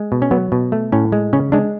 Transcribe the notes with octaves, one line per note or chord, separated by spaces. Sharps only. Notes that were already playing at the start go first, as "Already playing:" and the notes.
Already playing: G#3
B2
C#4
F#3 B3
B2
A3
A2 C#4
G#3
C#3 C#4
G#3 D4